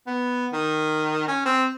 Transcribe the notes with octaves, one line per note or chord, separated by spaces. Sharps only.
B3
D#3
C#4
C4